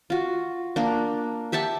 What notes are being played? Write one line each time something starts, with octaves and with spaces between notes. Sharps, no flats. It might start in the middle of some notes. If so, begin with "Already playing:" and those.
F4 F#4
A#3 D4
G4 E5 F#5 A5